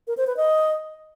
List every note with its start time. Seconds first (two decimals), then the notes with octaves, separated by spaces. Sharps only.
0.07 A#4
0.17 C5
0.27 B4
0.37 D#5